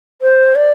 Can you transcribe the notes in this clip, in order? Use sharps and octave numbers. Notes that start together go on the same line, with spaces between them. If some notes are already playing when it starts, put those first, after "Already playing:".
C5
D5